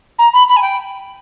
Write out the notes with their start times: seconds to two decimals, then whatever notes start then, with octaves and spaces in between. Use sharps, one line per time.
0.18 A#5
0.33 B5
0.48 B5
0.56 G#5
0.61 G5